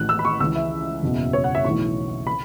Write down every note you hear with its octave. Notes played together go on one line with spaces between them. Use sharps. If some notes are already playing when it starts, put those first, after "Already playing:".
Already playing: A1 A2 E3 F#6
E6
B5
C#6
C#2 C#3 E3 E6
E5
F#1 E2 B2
C#5
F#5
E5
B1 A2 E3 C#6
B5